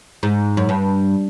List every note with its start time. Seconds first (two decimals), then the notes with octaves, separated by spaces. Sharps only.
0.23 G#2
0.57 F#2
0.69 G2